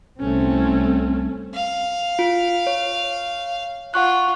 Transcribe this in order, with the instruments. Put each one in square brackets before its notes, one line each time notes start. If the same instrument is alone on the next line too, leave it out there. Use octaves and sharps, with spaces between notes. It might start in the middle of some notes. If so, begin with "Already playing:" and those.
[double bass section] C2 C4 [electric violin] A3 C#4
[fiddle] F5
[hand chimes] F4
C#5
[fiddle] F4 [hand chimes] F#5 C#6 F#6